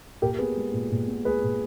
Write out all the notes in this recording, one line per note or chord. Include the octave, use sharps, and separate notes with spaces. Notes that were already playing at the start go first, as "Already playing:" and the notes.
A#2 G4 A#4
B3 G#4 B4
G#3
A#2
A#2
B3
G#3 G#4 B4
A#2